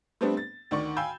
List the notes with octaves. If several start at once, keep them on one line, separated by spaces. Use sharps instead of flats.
G3 A3 B3 C4 D4
A6
D2 D#3 D5 C#6
F5 G5 G#5 B5 E6 G6